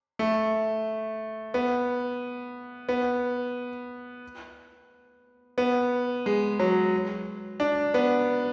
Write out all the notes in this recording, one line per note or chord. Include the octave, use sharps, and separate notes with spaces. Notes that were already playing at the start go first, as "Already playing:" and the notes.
A3
B3
B3
B3
G#3
F#3
D4
B3